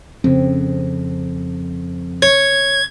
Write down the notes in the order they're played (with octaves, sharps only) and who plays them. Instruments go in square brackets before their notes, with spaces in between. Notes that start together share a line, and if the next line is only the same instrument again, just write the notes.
[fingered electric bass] F2 [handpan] C#3 C4
[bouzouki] C#5 [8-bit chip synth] G#6